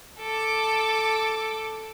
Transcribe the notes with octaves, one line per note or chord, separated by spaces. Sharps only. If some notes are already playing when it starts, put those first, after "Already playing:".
A4 D6